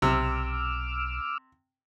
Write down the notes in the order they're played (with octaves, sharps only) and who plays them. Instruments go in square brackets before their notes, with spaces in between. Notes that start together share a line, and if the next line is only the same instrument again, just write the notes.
[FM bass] B1 [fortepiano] C3 [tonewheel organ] D6 E6 F6